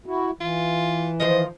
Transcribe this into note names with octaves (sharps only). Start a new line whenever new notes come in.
E4 F#4
E3 F4
D#3 F3 C5 D#5